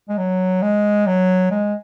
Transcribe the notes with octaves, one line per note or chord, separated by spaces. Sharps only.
G#3
F#3
G#3
F#3
G#3